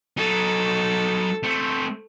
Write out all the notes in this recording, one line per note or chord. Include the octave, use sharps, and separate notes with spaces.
F#3 D#4 A4
A3 C4